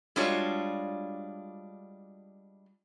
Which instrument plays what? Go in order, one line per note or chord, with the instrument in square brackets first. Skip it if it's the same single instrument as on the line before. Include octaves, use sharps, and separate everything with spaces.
[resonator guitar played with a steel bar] G3 G#3 D4 F4 F#4 C#5